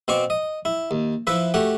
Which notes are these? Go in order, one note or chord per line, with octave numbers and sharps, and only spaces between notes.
B2 C4 F5 C#6 D6
D#5
E4
D#2
F3 E4 B4 E5
A3 F#4 G4 F#5